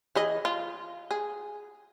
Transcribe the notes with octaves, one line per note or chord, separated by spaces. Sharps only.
E3 G#4 D#5
F4
G#4